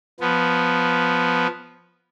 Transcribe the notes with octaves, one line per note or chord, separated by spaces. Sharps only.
F3 B3